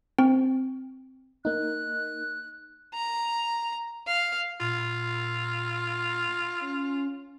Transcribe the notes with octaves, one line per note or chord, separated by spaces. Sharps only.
C4
A#3 D#4 F#6
A#5
F5
A#2 F4
C#4